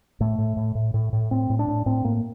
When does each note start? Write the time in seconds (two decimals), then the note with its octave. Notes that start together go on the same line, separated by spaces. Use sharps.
0.20 A2 A3
0.38 A2
0.57 A2
0.75 A2
0.94 A2
1.13 A2
1.31 A2 C4
1.50 A2
1.59 D4
1.68 A2
1.86 A2 C4
2.04 A2 A#3